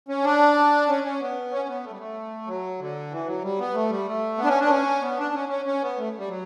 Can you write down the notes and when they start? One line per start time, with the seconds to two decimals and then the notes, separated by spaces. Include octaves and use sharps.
0.09 C#4
0.24 D4
0.89 C#4
1.04 C#4
1.20 B3
1.51 C#4
1.68 B3
1.84 A3
1.91 G3
1.98 A3
2.47 F#3
2.79 D3
3.11 E3
3.26 F#3
3.43 G3
3.59 B3
3.74 A3
3.90 G3
4.07 A3
4.38 B3
4.44 D4
4.48 C#4
4.60 D4
4.66 B3
4.70 C#4
5.02 B3
5.18 D4
5.34 C#4
5.49 C#4
5.66 C#4
5.82 B3
5.98 A3
6.18 G3
6.29 F#3